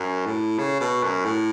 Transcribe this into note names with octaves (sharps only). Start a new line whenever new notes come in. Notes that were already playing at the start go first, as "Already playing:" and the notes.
Already playing: F#2
A2
C#3
B2
F#2
A2